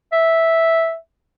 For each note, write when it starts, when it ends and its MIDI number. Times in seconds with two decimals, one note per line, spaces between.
0.12 0.95 76